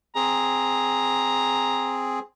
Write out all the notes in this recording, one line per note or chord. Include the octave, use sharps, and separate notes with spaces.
C4 G#4 A#5